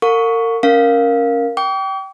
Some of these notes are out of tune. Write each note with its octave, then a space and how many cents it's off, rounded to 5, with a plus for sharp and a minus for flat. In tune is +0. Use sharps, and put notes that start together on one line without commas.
A#4 -35 F5 +45 C#6 +10
C#4 +0 A#4 +0 F5 +0
G5 -20 D6 -45